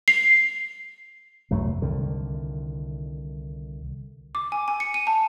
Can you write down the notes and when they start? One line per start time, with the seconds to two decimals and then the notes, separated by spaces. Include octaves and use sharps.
0.08 C7
1.51 C2 F#2 F#3 A3
1.81 C2 D3 D#3
4.35 D6
4.52 G#5
4.68 G#5
4.80 C#7
4.94 D#7
5.07 A5